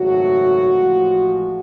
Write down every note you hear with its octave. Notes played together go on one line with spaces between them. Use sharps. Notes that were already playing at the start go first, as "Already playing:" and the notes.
Already playing: G#1 F#2 C#3 F#3 A3 F#4
A1 A2 F3 G#3